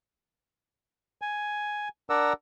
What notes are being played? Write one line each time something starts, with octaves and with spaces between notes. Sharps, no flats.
G#5
D4 A#4 D5 F#5 A#5 E6